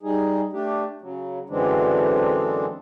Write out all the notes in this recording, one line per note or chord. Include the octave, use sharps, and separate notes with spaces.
G3 D#4 G#4
A3 D4 G4
C#3 F#3
F#2 D3 E3 G#3 C4 D4